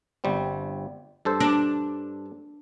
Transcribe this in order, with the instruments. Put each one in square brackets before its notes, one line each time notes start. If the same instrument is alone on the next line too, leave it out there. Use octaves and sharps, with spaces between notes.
[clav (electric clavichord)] G1 G3 C4
G2 A4 C5
[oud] D4